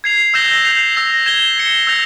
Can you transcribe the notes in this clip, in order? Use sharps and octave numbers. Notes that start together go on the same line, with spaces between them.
G#6 C7 F7
E6 G6 A#6 E7 G7
G6 C7 F7
E6 A#6 F7
G#6 E7 G7
G#6 C#7 G7
E6 G6 A#6 F7